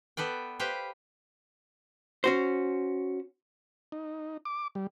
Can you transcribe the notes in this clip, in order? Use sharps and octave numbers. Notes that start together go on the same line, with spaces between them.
B3 A4 B4 D5 G5
G4 B4 C5 F5 G5
C#4 F#4 C5
D#4
D6
G3